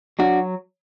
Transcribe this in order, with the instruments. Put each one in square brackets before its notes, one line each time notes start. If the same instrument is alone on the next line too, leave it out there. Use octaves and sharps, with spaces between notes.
[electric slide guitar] F#3 D4 F#4